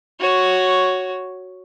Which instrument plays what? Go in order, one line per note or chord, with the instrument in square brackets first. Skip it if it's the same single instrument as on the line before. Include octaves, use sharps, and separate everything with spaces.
[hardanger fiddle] F#4 C#5